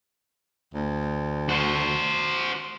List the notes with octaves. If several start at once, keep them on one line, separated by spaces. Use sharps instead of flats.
D2
F#4 C5